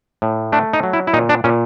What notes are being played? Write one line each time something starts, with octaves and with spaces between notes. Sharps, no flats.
A2
A3 D4
D#4
F#3
E4
E4
A#2 D#4
D4
A#2 C#4